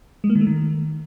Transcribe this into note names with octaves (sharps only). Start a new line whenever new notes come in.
G#3
A#3
D#3
A3
D#3